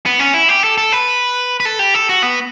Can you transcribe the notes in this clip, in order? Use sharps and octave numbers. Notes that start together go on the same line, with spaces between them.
B3
C#4
E4
G4
A4
A4
B4
B4
A4
G4
A4
F#4
B3